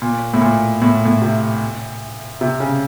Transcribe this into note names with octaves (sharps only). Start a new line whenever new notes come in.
A#2
A2
A#2
A2
A2
C3
C3
C#3